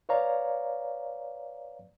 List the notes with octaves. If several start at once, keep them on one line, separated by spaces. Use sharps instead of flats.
B4 C#5 D5 F5 A#5